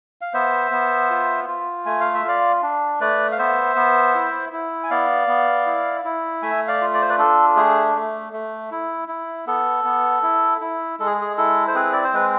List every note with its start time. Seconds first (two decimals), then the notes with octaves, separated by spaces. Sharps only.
0.21 F5
0.33 B3 C5 E5
0.71 B3
1.10 F4
1.48 F4
1.86 A3 G#5
2.00 F5
2.14 E5
2.24 F4 D5 F5
2.62 D4
3.00 A3 B4 D5
3.32 F5
3.38 B3 C5 E5
3.76 B3
4.15 E4
4.52 E4
4.84 G#5
4.90 B3 D5 F5
5.28 B3
5.66 E4
6.05 E4
6.42 A3 E5 G#5
6.68 D5 F5
6.81 F4
6.94 D5
7.02 C5
7.10 B4 D5
7.18 D4 A4
7.56 A3 G#4
7.95 A3
8.33 A3
8.71 E4
9.08 E4
9.47 B3 A4
9.84 B3
10.23 E4
10.61 E4
11.00 G#3 A4
11.06 G#4
11.21 G#4
11.38 E4 A4
11.68 C5
11.75 C4 G#4 B4
11.93 D5
12.04 C5
12.13 G#3 B4